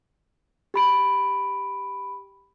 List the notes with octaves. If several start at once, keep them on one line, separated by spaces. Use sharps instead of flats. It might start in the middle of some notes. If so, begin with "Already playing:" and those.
G4 B5 D7